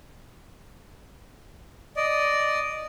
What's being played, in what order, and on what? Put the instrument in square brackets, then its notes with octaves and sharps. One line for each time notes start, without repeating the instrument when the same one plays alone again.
[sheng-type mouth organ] D5 D#5